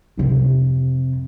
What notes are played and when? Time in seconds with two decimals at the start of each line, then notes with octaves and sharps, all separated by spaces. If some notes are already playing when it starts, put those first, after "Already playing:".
0.17 F2 C3